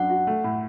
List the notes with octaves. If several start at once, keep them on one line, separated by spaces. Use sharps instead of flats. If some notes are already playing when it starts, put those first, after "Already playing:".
Already playing: F#2 F#3 D4 F#5
F#4
A3
A2